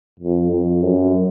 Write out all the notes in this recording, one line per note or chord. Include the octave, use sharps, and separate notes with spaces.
F2
F2
F#2